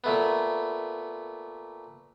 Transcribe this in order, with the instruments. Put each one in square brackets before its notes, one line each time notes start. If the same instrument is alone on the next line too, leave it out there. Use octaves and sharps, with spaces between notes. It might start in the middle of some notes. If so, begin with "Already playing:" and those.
[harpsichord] A#2 A3 B3